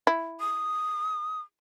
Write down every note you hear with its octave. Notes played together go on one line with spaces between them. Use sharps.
E4
D#6